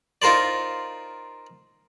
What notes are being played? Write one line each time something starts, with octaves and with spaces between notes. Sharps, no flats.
D#4 F4 A#4 C5 D5